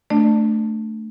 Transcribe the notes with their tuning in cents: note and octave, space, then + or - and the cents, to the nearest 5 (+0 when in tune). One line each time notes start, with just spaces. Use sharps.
A3 +0 D4 +0 D5 +25